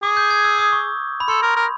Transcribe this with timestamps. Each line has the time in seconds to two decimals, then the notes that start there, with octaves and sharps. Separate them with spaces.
0.03 G#4 D6
0.17 G6
0.31 G#6
0.44 E6
0.59 D#6
0.73 C#6
1.20 B5
1.28 A4 C6
1.42 A#4
1.56 A#4